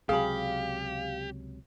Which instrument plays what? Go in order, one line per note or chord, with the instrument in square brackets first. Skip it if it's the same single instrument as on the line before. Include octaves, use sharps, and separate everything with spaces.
[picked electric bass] C#2 C3 F#3 [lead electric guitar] G4 [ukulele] G#4 B5 [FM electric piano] F5